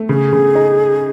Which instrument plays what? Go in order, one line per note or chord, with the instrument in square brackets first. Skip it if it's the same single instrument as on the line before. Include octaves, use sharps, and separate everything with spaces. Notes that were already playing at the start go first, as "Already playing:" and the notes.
Already playing: [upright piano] A3
[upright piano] C#3 [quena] G#4
[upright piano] C#3
D#4